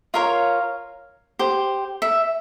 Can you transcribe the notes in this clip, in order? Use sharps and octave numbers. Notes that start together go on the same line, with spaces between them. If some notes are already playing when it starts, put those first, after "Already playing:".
F4 A#4 C#5 F5
G4 C5
E5